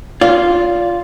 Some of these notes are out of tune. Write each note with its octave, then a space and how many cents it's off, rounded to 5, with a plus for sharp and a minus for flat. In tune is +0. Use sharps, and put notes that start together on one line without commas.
F4 +0 D5 -30